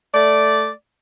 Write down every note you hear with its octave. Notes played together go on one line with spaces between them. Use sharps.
A3 D5